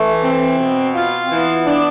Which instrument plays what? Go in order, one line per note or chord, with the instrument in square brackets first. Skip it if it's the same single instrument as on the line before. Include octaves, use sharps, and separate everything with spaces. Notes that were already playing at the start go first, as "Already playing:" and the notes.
Already playing: [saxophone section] E3 [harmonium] A3
[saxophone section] C4
B2
F4
[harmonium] C4
[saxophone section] E3 [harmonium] B3
[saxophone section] D4